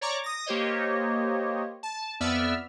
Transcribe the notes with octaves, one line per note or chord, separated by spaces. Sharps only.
C#5 D5 A#5 C#6 D6
D#6 A#6
A#3 G4 C5 C#5 D#5
A5
F2 B3 D5 E5 E6 F6